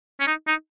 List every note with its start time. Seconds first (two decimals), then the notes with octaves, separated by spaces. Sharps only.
0.20 C#4
0.27 D#4
0.47 D#4